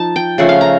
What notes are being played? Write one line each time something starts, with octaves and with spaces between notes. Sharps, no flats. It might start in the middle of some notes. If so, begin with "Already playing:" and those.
Already playing: F3 D#4 A5
G5
C#3 F3 A3 F#5
F5
A#5